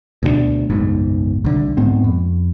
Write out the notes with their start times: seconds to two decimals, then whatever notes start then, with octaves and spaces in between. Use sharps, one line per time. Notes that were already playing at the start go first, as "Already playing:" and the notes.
0.23 D2 B2 G3 D4
0.70 F#1 B1 G#2
1.45 C2 D3
1.77 G#2 G#3 B3 C4
2.04 F2